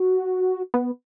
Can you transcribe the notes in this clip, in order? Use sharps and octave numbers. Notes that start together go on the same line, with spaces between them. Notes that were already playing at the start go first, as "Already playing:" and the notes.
Already playing: F#4
B3